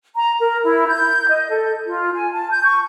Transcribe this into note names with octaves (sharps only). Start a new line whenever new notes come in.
A#5
A#4
E4
G6
D#5
A4
F4
G#5
A5
G6
C#6